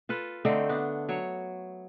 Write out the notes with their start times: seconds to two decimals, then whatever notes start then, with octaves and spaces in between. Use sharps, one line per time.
0.09 F4 A4 B4
0.45 D3 A3 C4 D#4
0.69 B3 D4
1.09 F#3 C#5